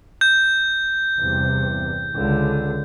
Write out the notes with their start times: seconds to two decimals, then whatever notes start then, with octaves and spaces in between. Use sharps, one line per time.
0.21 G6
1.19 E2 G2 C3
2.14 C#2 D3